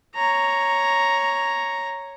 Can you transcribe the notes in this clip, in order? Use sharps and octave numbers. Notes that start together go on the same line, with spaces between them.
C#5 A#5